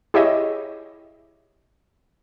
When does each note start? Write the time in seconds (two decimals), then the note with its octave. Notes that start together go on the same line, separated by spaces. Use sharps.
0.14 E4 G4 G#4 C#5 D#5 E5